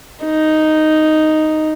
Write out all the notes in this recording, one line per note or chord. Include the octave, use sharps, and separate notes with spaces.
D#4